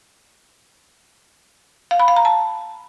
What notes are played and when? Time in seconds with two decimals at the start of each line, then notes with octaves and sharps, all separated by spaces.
1.91 F5
1.99 B5
2.08 F5
2.16 A#5
2.25 A5